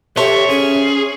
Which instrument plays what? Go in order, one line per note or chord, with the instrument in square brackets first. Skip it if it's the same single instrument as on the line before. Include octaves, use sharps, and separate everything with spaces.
[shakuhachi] G4 [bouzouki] A4 C5 C#5 [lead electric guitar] E5
[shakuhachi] C#4 [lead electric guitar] G#4